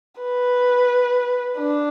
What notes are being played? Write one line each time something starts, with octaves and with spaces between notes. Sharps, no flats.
B4
D4